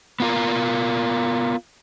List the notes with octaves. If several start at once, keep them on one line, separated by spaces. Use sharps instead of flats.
B3 F4 A#4